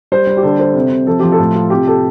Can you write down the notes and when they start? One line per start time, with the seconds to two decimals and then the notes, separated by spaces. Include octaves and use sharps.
0.12 G3 C5
0.27 G3
0.37 G4
0.43 D3 A4
0.59 A4 C5
0.75 C3
0.91 C3
1.07 F3 A4
1.20 F3 G4
1.32 A4
1.39 A2
1.55 F4
1.70 C3 G4
1.87 G4 A4